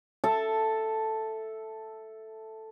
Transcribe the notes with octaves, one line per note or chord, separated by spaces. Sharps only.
A4 E5 A5